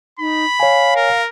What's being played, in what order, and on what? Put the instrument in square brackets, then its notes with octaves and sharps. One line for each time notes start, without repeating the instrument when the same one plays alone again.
[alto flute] D#4 [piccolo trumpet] B5
[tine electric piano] C#5 G#5 [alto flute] F5
[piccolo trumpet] A#4